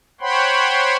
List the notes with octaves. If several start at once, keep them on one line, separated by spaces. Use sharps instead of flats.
C5 C#5 F#5 G5 B5 C6